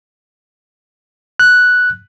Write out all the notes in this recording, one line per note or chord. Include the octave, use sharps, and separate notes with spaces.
F#6